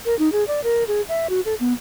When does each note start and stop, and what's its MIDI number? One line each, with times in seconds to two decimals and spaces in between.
0.06 0.17 70
0.19 0.31 63
0.32 0.44 68
0.48 0.63 74
0.64 0.84 70
0.88 1.02 68
1.09 1.27 76
1.30 1.41 66
1.45 1.54 69
1.60 1.73 59